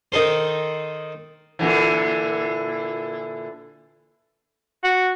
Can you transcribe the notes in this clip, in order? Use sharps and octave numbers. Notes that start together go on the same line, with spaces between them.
D#3 D#4 A4 C5
A#2 D3 E3
F#4